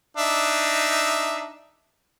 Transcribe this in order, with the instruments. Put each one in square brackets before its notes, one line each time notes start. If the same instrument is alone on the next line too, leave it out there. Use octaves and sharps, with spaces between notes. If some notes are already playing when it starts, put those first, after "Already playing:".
[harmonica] D4 D#4 E5